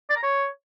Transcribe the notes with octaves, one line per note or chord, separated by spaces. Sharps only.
D5
A#5
C#5